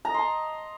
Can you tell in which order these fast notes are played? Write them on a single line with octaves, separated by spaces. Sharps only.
A#5 D#5 C6 A5